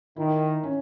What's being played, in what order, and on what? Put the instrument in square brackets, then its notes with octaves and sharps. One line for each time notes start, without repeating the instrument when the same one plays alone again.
[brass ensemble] D#3 [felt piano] E4
[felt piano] C#4